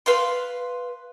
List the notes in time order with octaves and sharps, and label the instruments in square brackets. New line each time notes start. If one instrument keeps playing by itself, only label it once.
[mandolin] B4 F5 C6